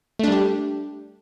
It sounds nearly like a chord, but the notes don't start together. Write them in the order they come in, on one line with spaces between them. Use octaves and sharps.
A3 D4 G3 G4